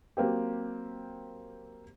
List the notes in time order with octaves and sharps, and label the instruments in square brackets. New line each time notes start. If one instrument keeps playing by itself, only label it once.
[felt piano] F#3 A#3 C4 G4